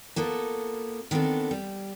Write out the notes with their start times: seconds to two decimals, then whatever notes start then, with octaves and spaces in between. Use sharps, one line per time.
0.16 A#3 B3 F4 A4
1.11 D#3 B3 C4 D4 A4
1.51 G3